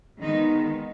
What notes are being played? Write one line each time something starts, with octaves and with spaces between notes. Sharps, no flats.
D#3 G#3 B3 D#4